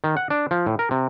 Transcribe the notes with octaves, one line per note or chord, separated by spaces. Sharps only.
D#3
F#5
D4
F3
A2
A#4
C3